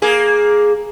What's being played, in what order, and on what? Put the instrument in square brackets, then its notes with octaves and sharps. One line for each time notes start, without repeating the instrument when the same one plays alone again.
[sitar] A#3 G#4